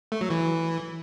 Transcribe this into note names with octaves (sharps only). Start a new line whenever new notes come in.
A3
F#3
E3